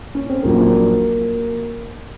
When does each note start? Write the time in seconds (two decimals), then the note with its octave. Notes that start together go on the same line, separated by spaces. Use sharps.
0.15 C#4
0.29 C4
0.43 A#1 A#2 F#3 A#3